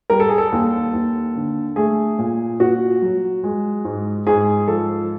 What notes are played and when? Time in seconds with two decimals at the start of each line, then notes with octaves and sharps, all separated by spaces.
0.10 G3 A#4
0.20 A4
0.29 G#4
0.38 A4
0.52 D#2
0.93 D#2
1.35 D3
1.76 A3 G#4
2.18 A#2
2.60 A#2 F#4
3.02 F#3
3.44 G#3
3.85 G#2
4.27 G#2 G#4
4.68 F3 A4